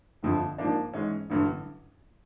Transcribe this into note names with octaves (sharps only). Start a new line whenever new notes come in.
G1 F2 D3 F3
G#2 F3 A#3 D4
G#2 E3 G#3 C#4
A1 G2 D3 F#3